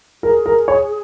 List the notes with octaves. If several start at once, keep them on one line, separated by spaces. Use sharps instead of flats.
G#4 A#4
A#4
C#5